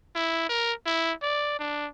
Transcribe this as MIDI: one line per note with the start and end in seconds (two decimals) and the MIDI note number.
0.16 0.48 64
0.50 0.73 70
0.87 1.13 64
1.23 1.58 74
1.60 1.87 62